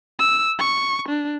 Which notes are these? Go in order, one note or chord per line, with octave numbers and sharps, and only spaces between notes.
E6
C#6
D4